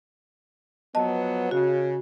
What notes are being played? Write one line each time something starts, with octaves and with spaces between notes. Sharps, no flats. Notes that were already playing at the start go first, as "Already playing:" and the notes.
F3 F#3 B3 D#5 A5
C#3 F#4